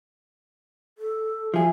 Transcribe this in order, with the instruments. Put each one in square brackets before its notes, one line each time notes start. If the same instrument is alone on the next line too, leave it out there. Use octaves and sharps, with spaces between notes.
[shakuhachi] A4
[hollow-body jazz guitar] F3 G#4 [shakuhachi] E5